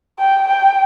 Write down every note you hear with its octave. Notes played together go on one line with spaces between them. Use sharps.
G5
G5